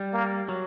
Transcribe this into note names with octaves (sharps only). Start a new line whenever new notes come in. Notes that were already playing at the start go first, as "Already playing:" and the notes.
Already playing: G3
A#3
F#3